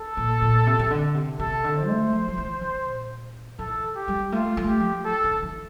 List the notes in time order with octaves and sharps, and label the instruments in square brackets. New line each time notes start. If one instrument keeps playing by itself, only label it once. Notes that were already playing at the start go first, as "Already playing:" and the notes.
Already playing: [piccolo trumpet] A4
[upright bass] A#2
A#2
C3
C3
D3
C3
[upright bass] C3 [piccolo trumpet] A4
[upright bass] D3
[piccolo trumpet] C5
[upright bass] A3
F3
F3
E3
E3
A#2
[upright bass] E3 [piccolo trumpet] A4
[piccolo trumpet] G4
[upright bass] G3
[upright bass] A3 [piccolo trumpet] F4
[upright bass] A3
[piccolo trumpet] G4
[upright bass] F3
[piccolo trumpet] A4
[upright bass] D3
E3